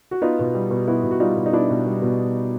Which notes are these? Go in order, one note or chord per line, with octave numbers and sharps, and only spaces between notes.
F#4
B3 D#4 F4
B2
G3
B2
B3 E4 F#4
B2
F#4
G3 D#4 F4
B2
D#4
B3 D4 E4
B2
G3
B2